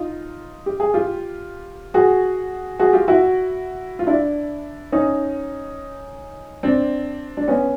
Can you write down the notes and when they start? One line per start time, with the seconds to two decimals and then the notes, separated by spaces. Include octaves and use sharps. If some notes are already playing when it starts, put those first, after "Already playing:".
Already playing: D#4 F4
0.66 G4
0.80 G#4
0.94 F4 G4
1.94 F#4 G#4
2.79 F#4 G#4
2.93 F4 G4
3.08 E4 F#4
3.99 F4
4.07 D4 E4
4.92 C#4 D#4
6.63 C4 D4
7.37 D4
7.48 B3 C#4